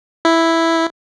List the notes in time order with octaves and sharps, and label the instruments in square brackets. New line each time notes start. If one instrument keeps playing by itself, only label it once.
[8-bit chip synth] E4